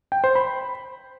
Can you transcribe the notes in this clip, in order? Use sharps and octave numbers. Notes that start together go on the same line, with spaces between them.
G5
C5
B5